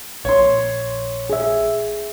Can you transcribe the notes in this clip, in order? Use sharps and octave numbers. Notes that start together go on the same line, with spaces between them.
A#1 C#5 C6
G#4 E5